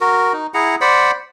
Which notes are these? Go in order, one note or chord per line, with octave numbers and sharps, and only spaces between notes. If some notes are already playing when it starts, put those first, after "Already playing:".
F#4 A#4
D#4
E4 G#4 F#5 A#5
C5 D5 F#5 B5